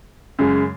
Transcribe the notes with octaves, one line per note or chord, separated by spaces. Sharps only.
F#2 C#3 G#3